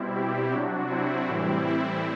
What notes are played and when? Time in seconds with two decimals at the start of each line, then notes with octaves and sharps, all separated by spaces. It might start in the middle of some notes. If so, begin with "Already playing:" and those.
Already playing: B2 G3 C4 E4
0.14 E4 G4
0.52 C3 F#3 D4 F#4
0.90 C4 E4
1.27 A2 E3 G3
1.66 C4 E4